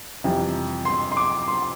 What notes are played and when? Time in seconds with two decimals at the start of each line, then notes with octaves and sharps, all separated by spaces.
0.24 F2 C3 E3 G3
0.85 C6
1.12 C6
1.17 D6
1.48 C6